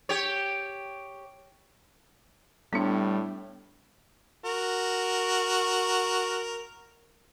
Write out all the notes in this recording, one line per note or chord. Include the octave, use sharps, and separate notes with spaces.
G4 C#5
A2 G3 B3 D4
F#4 A#4